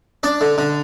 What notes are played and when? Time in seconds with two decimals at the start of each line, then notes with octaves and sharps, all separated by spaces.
0.23 D4 D5
0.41 D3
0.58 D3